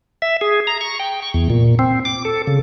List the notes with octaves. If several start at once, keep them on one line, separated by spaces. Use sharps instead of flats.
E5
G#4
A#5
C#6
G5
C#6
E2
A#2
C4
D6
A4
C#3